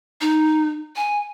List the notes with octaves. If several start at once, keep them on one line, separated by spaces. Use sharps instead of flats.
D#4
G#5